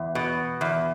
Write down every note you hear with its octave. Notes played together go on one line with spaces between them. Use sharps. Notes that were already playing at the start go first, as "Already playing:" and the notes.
Already playing: E2
B2
E2